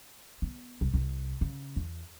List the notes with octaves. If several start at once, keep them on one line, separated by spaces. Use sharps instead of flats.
B3
C2
C2 C3
C#3
E2